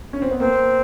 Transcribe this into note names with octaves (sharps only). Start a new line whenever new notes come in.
C#4
C4
B3
A#3 C4